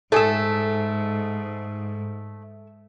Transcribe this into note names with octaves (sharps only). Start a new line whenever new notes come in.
G#2 A3 G#4 A4 E5